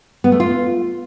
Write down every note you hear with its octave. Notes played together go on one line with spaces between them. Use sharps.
B3
A3
F4